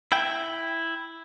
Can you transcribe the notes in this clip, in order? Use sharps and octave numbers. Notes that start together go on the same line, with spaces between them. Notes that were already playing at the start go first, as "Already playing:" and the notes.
E4 G5